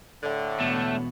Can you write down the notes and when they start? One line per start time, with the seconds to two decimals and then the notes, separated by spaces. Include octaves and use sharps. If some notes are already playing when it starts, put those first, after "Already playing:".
0.23 A2 D3
0.60 E2 B2 A3 B3